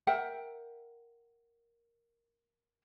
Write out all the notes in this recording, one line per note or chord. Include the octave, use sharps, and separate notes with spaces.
A#4 E5 F#5 G5